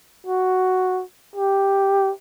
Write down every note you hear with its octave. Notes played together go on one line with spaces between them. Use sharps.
F#4
G4